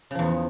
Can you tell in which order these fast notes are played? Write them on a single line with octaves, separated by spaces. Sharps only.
C#3 F3 E2